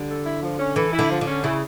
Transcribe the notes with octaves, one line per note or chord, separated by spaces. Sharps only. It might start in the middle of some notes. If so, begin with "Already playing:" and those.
Already playing: D3 G3
A4
E4
F3
C#4
E3 A4
E4
D3
F3
D3
C#4
C#3 E4